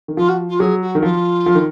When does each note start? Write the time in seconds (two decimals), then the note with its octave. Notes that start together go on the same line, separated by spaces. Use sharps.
0.08 D#3
0.17 F3 F4
0.28 F#4
0.49 F4
0.59 F#3 G#4
0.81 F#4
0.95 D#3
1.03 F3 F4
1.46 F3
1.55 D#3